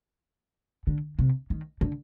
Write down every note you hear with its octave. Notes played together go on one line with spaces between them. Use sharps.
D3
C3
D#3
D3